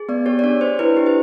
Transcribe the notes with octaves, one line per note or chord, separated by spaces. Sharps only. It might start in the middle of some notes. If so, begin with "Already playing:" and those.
Already playing: G#4
B3 D5
G4 C#5
D5
D4 C#5
D4 C5
E4 B4
G4
C5